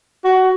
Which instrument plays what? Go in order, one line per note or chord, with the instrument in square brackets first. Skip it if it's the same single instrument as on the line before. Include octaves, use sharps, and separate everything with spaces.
[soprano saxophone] F#4